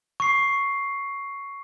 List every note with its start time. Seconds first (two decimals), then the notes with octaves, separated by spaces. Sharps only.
0.20 C#6 C7